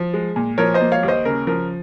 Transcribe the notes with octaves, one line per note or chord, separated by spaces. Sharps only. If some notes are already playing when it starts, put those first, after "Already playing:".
Already playing: F3
G#3
A#2
F3 A#4 C#5
C5 D#5
A#3
C#5 F5
D#2
C5 D#5
C#3 A#4
F3 A#4